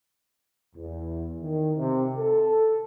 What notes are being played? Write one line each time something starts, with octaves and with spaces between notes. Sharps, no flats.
E2
D#3
C3
A4